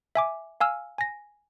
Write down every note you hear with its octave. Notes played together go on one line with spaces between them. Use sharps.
E5 G#5 D6
F5 G#5 E6 F6
G#5 A#6